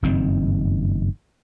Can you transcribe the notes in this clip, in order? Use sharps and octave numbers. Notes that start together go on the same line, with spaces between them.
F#1 G2 D#3 C4